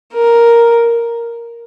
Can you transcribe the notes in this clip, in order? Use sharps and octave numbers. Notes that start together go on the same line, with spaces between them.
A#4